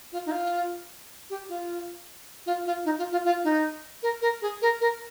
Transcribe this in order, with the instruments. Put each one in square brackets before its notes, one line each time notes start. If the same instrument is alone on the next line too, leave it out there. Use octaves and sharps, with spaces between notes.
[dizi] F4
D#4
F4
G4
F4
F4
F4
D#4
F4
F4
F4
D#4
A#4
A#4
G#4
A#4
A#4